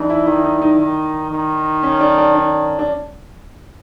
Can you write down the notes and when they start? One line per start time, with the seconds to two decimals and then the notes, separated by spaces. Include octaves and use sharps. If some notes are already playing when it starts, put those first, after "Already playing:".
Already playing: E3 D4 D#4
0.10 E4
0.27 D#3 E4
0.44 D#4
0.62 D#4
0.79 D#3
1.31 D#3
1.83 C#4
2.01 D4
2.18 D4
2.35 D4
2.79 D4